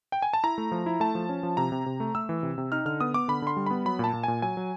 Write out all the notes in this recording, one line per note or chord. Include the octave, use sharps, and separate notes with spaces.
G5
G#5
A5
E4 A#5
A3
F3
E4
A3 A5
F3
C#4
F3
C3 A#5
C3
C3
A3
A3 E6
E3
C3
C3
D#4 F6
D3 F6
B3 D#6
B3 D6
D3 B5
D3 C6
G3
B3 B5
F#3 B5
A#2 A5
A#2
A#2 G#5
F#3 G#5
F#3